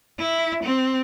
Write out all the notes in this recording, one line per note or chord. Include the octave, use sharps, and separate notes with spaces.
E4
C4